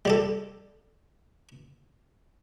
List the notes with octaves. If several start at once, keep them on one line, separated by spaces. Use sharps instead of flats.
G3 G4 A4